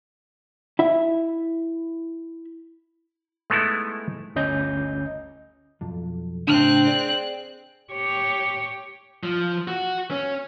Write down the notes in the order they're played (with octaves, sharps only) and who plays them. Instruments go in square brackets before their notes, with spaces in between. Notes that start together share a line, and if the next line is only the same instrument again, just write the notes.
[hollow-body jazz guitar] E4 E5
[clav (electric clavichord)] G#3 A3 B3 D#4 E4
[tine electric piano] G1 D2 C#4 D#5 G6
[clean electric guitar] B1 F2
[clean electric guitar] A2 C#3 D4 [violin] C4 F#6
[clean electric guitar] G#4 D5
[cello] G4 C#5
[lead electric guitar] F3
F#4
C#4